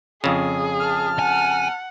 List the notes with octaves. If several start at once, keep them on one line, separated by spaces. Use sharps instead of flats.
F2 C#3 G#4
A5 F6
F#5 G#5